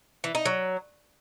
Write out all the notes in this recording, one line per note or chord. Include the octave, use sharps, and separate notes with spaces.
E3
D#4
F#3